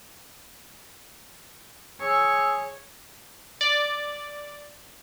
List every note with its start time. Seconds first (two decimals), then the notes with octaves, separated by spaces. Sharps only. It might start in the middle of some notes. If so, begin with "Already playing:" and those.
2.01 G#4 C#5 E6
3.61 D5